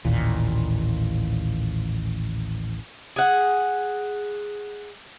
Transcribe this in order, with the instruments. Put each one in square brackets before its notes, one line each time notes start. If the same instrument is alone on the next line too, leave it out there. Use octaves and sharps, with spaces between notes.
[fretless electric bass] A1 D#2 A#2
[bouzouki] G#4 F#5